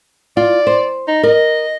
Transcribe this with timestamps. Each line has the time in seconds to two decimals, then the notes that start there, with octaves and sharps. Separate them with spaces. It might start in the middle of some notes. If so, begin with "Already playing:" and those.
0.37 F4 D5
0.67 C5
1.08 D#4
1.23 A#4 D#5